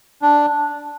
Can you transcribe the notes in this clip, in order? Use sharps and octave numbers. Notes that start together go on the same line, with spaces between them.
D4